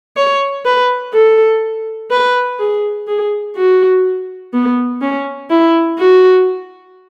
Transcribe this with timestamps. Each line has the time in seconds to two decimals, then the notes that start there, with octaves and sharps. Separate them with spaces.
0.17 C#5
0.65 B4
1.14 A4
2.11 B4
2.59 G#4
3.08 G#4
3.56 F#4
4.53 B3
5.02 C#4
5.50 E4
5.99 F#4